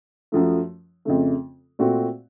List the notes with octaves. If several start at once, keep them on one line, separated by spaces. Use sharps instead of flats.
F#2 F3 A3
F2 C#3 A3
A#2 A3 C4 F#4